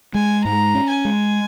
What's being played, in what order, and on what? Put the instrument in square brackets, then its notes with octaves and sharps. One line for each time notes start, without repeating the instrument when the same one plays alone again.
[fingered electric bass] G#3 [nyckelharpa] G#5
[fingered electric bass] G#2 [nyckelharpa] A#5
[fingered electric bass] C#4
[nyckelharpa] G#5
[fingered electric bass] G#3